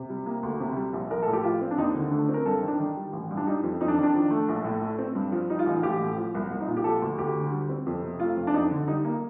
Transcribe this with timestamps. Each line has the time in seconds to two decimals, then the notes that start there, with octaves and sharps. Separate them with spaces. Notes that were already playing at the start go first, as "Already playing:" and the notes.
Already playing: C3
0.10 G3
0.26 A#3
0.43 D2
0.60 C3
0.77 G3
0.94 A#1
1.10 A#1 A#4
1.23 A2 A4
1.33 G4
1.44 F3 F4
1.62 C4
1.71 D4
1.78 D#2 D#4
1.95 D3
2.11 A3 D4
2.29 C4
2.34 A#4
2.46 G2 A4
2.62 D#3
2.68 D4
2.79 D#3 D#4
2.97 G3
3.13 A1
3.31 G2
3.37 D4
3.47 G3 D#4
3.63 F2
3.81 F2 D#4
3.88 D4
3.97 D#3
4.03 D4
4.14 F3
4.31 A3
4.49 A#1
4.65 A2
4.81 A3
4.99 C4
5.15 G2
5.32 F3
5.50 G3 D#4
5.59 F4
5.66 A1 D#4
5.83 A1 G4
6.00 A2
6.17 F3
6.35 C2
6.50 C2
6.61 D#4
6.67 A#2 F4
6.77 G4
6.84 F3 A4
7.02 D2
7.18 D2 G4
7.36 D3
7.52 G3
7.69 C4
7.86 F2
8.02 C3
8.20 A3 F4
8.37 F2
8.47 D4
8.54 F2 D#4
8.71 D3
8.88 G3 D#4
9.05 A#3